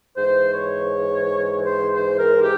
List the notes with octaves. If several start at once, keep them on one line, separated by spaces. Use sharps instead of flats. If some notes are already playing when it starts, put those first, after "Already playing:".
G#2 E3 C5
C#5
C5
C5
A#4
G4